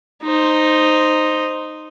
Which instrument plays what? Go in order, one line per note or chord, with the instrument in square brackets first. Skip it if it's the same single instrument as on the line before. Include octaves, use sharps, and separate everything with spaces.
[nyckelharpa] D#4 C5